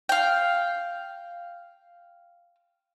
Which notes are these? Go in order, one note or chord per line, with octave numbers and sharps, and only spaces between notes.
F5 G5